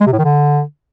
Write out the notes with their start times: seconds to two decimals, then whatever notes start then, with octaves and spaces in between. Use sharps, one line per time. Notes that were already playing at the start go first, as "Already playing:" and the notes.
0.01 G#3
0.07 C3
0.13 A2
0.19 D#3
0.24 D3